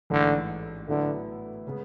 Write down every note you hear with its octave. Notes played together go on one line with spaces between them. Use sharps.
A1 G#2 D3 E3
A2 D3 F#3 B3 E4
C#3 G#3 B3